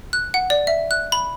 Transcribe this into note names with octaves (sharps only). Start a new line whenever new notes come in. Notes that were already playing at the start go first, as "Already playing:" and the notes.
F#6
F#5
D5
E5
F#6
B5